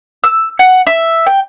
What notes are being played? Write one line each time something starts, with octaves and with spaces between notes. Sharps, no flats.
E6
F#5
E5
G5